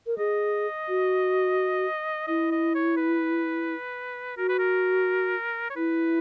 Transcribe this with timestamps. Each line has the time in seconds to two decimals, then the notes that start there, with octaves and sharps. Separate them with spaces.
0.07 A#4
0.18 G#4 D#5
0.89 F#4
2.28 E4 D#5
2.52 D#5
2.75 C#5
2.97 B4
4.37 F#4 A#4
4.49 B4
4.59 A#4
5.70 C#5
5.76 E4 B4